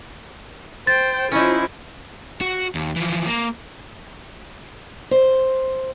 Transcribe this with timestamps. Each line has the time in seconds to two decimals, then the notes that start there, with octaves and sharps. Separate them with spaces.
0.87 C5 G5 A6
1.32 F3 C#4 D#4 E4
2.41 F#4
2.75 D#2
2.96 E3 F3
3.26 A#3
5.11 C5